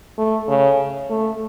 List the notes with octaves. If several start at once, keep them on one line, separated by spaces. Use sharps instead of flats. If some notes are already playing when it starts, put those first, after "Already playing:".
A3
C#3
A3